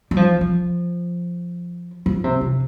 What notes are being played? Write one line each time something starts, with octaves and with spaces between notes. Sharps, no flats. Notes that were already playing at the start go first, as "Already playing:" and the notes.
G3
F3
F3
F3
C3
C3